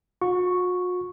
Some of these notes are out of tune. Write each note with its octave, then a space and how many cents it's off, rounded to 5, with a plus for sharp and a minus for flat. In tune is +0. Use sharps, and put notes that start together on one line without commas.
F#4 -45 C#6 +0